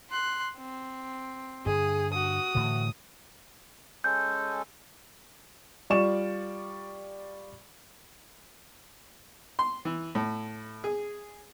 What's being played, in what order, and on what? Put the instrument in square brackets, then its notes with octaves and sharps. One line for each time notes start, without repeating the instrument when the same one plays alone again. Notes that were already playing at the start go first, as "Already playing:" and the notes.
[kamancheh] C6 F#6
C4
[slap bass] G2 D3 [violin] G#4 [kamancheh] D#6
[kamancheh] F#4 [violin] D#6
[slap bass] A2 D3 E3
[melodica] G#3 C#4 A4 [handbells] G6
[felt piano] G3 F4 D5 C#6 E7
[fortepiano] C6
E3
A2
G#4